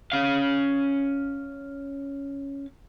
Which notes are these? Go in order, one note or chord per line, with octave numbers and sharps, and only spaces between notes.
C#4 F5